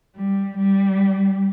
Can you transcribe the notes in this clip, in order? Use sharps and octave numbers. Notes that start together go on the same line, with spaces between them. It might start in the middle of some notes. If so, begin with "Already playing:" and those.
G3
G3